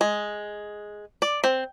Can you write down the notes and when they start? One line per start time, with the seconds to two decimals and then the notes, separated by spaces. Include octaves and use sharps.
0.01 G#3
1.22 D5
1.44 C4